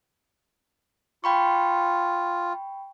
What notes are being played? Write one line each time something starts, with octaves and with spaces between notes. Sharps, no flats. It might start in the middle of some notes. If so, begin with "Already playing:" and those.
F4 G5 B5 C#6